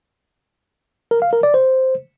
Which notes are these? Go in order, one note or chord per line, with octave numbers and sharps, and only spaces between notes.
A#4
F5
A#4
D5
C5